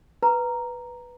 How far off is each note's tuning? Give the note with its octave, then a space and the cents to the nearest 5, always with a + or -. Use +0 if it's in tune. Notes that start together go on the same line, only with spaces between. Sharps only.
B4 +0 A#5 +0